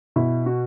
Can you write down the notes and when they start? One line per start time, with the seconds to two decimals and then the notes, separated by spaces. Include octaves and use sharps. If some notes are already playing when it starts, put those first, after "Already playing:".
0.16 B2 E4
0.46 F#4